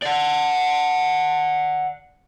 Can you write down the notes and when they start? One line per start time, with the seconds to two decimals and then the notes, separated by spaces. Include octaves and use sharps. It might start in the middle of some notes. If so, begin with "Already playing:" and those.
0.02 D5 F#5